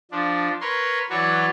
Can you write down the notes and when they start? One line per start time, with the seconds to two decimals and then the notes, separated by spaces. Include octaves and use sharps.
0.11 F3 D4
0.61 A#4 B4 C#5 C6
1.10 E3 F#3 F#4 C#5 D5